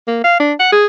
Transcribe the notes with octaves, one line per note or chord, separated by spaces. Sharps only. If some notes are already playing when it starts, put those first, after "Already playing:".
A#3
F5
D4
F#5
G#4